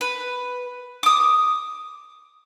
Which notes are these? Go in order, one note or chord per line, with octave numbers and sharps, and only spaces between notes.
B4
D6 D#6